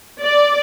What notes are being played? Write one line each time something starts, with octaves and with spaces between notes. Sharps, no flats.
D5